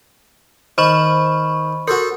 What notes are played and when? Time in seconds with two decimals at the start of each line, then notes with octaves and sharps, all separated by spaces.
0.78 D#3 C5 B5 C#6
1.88 F#4 A4 A#4 C5